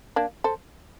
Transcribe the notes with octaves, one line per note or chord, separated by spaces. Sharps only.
A#3 D4
A4 C5